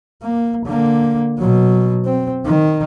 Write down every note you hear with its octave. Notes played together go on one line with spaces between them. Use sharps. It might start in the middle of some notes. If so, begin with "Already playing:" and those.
A#3
D3 A#3
B2 F#3
C4
D#3